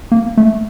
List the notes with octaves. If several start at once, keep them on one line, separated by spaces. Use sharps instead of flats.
A#3
A3